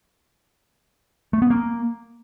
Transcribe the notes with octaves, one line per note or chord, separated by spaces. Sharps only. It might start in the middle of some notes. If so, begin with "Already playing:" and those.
A3
B3
A#3